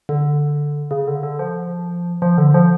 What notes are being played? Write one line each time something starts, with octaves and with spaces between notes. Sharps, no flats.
D3
C#3
D3
D3
F3
F3
D3
F3